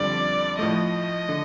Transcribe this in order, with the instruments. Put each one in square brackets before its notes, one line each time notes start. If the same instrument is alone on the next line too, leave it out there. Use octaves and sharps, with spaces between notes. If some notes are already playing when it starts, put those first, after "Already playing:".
Already playing: [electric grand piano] F2 D3 G3 [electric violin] D5
[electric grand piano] A2 F3 A3 [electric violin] D#5
[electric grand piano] D3